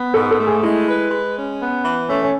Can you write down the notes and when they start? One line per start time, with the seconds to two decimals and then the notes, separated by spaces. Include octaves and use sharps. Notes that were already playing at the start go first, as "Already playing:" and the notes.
Already playing: B3
0.14 G#2 A4
0.31 A4
0.38 A3
0.47 G#4
0.63 G#3 E4
0.87 B4
1.11 G#3
1.36 C#4
1.60 B3
1.84 E3
2.09 A3 C#4
2.23 C#4